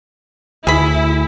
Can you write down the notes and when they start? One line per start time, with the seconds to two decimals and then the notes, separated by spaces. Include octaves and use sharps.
0.67 D2 E4 G#4 B5